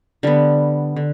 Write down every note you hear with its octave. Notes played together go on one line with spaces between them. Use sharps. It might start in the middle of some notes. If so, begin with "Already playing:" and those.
D3 G3 B3
D3